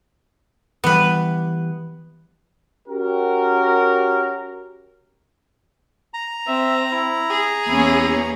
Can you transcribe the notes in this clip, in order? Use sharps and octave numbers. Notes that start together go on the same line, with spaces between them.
E3 G3 B3 B4
C#4 F#4 G4 A#4
A#5
C4 E5
E4
G#4
E2 A#3 C#4 E4